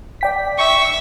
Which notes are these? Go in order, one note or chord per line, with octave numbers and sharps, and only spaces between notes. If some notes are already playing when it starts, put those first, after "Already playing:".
D5 G5 B6
E5 C#6